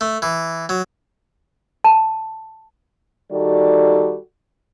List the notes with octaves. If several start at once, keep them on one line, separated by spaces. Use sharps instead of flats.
A3
E3
F#3
A5
D#3 G3 F#4 A4 D5